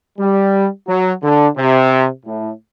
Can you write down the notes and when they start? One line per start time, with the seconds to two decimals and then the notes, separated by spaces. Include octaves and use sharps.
0.19 G3
0.88 F#3
1.23 D3
1.57 C3
2.26 A2